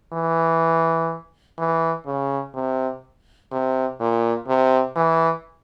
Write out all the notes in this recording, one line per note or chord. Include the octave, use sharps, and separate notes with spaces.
E3
E3
C#3
C3
C3
A#2
C3
E3